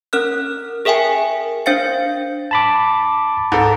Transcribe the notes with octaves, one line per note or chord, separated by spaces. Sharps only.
C#4 A#4 F6 F#6
G#4 A#4 E5 G5 G#5
D4 C5 F5 A6 C#7
A5 B5 D6
G#2 A4